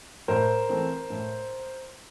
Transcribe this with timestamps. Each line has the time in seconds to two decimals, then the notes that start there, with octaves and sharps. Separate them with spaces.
0.28 A2 A#4 C5
0.69 E3 A3 C4
1.10 A2